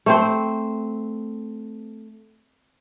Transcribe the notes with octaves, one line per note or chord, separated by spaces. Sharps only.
A3 C4 C5